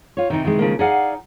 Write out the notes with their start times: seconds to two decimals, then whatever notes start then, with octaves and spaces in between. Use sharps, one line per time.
0.17 F4 C#5
0.30 C3 D#3 E3 D#4
0.45 D#3 G#3
0.59 C#3 F3 A#3
0.79 D#4 G#4 D5 F5 F#5 G#5